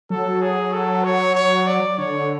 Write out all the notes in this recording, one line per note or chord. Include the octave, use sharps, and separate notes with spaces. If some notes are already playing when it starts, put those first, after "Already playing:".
F#3 A4
G#4
A4
C#5
C#5
D5
D3 C#5